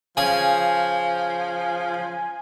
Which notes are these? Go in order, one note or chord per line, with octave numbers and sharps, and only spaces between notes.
C#3 F3 G#4 G#5